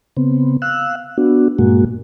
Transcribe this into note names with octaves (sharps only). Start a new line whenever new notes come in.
C#3 B3 C4
F5 E6 F#6
B3 D4 F#4
G2 A#2 G#3 A#3 F#4